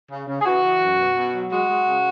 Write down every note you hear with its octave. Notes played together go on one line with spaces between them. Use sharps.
C#3
C#3
G#4
E3 F#4
E3
F#2
B2
B2
F#3
G#3 F#4
G#3
C#3